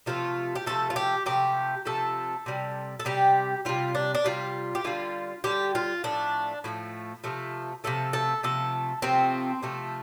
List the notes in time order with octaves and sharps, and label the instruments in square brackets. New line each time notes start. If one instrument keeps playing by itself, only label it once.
[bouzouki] C3 F3 A3 F4
G4
C3 F3 A3 A4
F4
G4
C3 F3 A3 G4
C3 F3 A3 A4
C3 G3
A4
C3 G3 G4
C3 G3 F4
D4
D4
C3 G3 F4
G4
D3 G3 F4
D3 G3 G4
F4
A2 F3 A3 D4
A2 F3 A3
C3 F3 A3
C3 F3 A3 A4
A4
C3 F3 A3 A4
C3 F3 A3 C4
C3 F3 A3